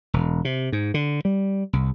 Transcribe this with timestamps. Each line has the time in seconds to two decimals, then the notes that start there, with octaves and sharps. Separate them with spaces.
0.14 E1
0.45 C3
0.72 G#2
0.94 D3
1.25 G3
1.73 C2